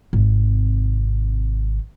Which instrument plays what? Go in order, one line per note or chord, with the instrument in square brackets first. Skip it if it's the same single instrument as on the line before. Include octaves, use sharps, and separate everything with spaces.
[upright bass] G#1 C3